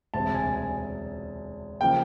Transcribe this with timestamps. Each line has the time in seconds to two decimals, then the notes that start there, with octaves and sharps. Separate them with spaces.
0.14 E1 D2 C3 A5
0.34 G#5
0.56 G#5
1.81 C#3 F3 A#3 G5